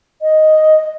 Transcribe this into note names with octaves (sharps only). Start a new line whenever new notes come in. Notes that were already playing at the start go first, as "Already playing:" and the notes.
D#5